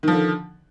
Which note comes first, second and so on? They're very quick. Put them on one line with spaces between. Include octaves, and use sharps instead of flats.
D#3 F3 D3